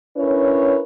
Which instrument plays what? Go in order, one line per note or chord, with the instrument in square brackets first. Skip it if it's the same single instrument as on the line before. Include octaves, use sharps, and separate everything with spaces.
[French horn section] C#4 D4 E4 A#4 B4 C#5